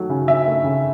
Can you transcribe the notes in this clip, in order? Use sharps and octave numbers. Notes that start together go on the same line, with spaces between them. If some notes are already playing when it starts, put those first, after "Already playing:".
Already playing: D#3 F#3 A3
C#3
C#3 E5
A3
C#3